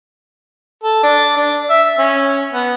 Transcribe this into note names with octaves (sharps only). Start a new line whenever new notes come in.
A4
D4
D4
E5
C#4
B3